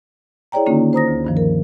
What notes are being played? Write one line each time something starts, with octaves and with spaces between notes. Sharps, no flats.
E4 G#4 C#5 D5 G5 A#5
D3 D#3 A#3 C#4 D#4 F4
C5 A#5 D#6 A#6
D2
G2 D#3 F3
A#4